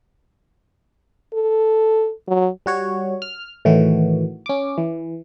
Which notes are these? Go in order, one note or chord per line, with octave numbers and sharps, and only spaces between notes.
A4
F#3
G3 F#4 C#5
F6
A2 D#3 E3 F#4
C#4 D6
E3